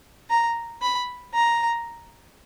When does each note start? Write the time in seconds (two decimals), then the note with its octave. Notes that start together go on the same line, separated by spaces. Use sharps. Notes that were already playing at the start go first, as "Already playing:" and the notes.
0.30 A#5
0.82 B5
1.34 A#5